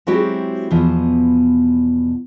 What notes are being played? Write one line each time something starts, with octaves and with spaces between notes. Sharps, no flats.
F#3 G#3 C4 E4 F#4 G4
E2 B2 F3 D#4